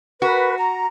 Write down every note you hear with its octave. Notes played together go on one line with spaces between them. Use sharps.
F#4 A#4 B4
A#5